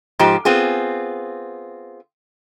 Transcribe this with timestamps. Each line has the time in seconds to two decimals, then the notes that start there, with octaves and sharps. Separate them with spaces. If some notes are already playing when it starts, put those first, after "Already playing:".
0.19 G#2 F3 G4
0.45 B3 C4 F4 G#4